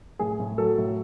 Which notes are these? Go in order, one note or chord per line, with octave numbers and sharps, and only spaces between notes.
A2 G#4
A2
F#3 A4
A2